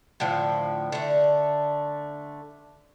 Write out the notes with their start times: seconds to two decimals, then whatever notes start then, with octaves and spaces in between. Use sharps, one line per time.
0.20 A2 D3 F3
0.92 D3 A3